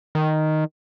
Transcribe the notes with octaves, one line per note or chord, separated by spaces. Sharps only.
D#3